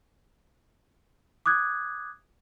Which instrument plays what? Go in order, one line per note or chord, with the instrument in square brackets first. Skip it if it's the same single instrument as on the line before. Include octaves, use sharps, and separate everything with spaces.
[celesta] D6 D#6 F#6 G#6